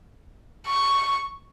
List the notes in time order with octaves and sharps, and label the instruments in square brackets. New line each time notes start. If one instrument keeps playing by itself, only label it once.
[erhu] C#6